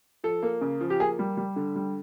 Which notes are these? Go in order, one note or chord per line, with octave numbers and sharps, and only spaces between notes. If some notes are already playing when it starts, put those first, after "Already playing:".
F3 A4
A#3
C#3
F3
G4
A#3 G#4
G3
G3
D3
G3